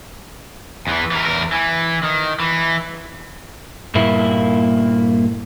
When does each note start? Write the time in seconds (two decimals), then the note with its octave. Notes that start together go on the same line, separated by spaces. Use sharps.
0.87 E2 E3
1.11 E3 A#4
1.25 E2 A#4
1.52 E3
2.03 D#3
2.40 E3
3.95 G2 A#2 A#3 E4